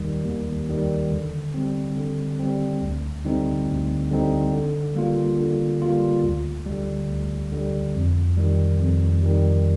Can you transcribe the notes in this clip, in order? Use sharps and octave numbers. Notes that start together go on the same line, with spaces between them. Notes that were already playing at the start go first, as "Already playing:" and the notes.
Already playing: D#2 D#3 G3
D#2
D#3 G3
D3
G3 C4
D3
G3 C4
D2
D3 G3 C4 D#4
D2
D3 G3 C4 D#4
D3
G3 A#3 F4
D3
G3 A#3 F4
D2
D3 G3
D2
D3 G3
F2
D#3 G3
F2
D#3 G3